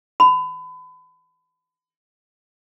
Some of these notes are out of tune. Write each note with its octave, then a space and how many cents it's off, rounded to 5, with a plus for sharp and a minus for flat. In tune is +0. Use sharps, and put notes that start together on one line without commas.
B5 +35